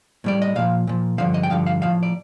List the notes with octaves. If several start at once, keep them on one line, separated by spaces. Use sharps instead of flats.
A2 G3 D5
D#5
A#2 F3 F5
A#2 F3
G2 D3 F3 F5
D#5
G5
G2 D3 F3 F5
F5
A2 F3 F5
D5